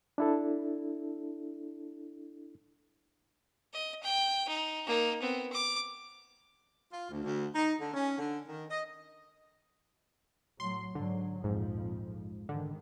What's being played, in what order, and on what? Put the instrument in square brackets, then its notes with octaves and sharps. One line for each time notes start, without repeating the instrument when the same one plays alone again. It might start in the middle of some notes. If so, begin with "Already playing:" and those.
[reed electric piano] D4 E4 A4
[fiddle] D#5
G5
D#4
A#3 D#4
B3 C4
D6
[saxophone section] F4
D2
D2
D#4
D3
C#4
D3
D#3
D#5
[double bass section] A2 F#3 [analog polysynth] C6
[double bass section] G#2 F#3 [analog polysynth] D3
[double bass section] A#1 F2 F3 [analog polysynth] G#2
[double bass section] G#2 D#3 [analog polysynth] D3